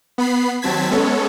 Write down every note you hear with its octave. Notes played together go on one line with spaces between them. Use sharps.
B3 B5 C7
D#2 F#3 C4 A5 G#6 B6
G#3 B3 C#4 A4 C#5